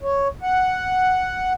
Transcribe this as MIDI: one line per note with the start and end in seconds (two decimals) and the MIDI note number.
0.03 0.28 73
0.42 1.53 78